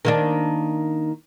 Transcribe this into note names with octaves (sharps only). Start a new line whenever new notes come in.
D#3 A#3 D4